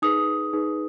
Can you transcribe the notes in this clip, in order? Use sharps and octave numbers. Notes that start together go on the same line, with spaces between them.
D#4 G#4 B4 D#6
D#4 G#4 B4